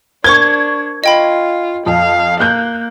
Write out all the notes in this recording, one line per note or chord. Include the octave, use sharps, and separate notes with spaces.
D4 A#4 C5 C#6 G#6
F4 D#5 G5 B5
F2 F5
A#3 F#6 G6